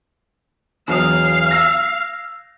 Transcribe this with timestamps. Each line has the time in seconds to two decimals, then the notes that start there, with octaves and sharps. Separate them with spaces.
0.88 E1 F#3 F5 D#6
1.51 E6 A#6